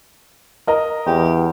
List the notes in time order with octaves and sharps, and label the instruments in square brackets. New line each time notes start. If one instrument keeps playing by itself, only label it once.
[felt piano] A#4 D#5 A#5
[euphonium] E2 [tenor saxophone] G4